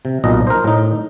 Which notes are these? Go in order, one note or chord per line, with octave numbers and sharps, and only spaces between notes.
C3
B1 A#2 D#5
A#4 C5
A2 D#4